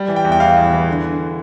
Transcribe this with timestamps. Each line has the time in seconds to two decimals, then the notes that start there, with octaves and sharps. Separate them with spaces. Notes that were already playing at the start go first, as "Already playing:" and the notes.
Already playing: G3
0.08 E3
0.16 G5
0.25 E2
0.32 G5
0.40 E3 F5
0.57 E2
0.73 E3
0.88 D3
1.05 D3